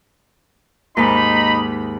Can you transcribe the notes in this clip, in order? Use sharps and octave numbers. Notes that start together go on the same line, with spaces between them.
D#2 G#2 D#4 B5